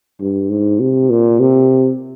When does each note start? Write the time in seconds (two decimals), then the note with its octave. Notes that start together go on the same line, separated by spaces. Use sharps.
0.20 G2
0.50 G#2
0.80 C3
1.10 A#2
1.40 C3